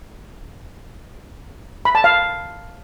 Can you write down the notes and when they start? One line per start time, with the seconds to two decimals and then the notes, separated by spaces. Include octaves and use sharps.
1.85 B5
1.95 A5
2.04 F5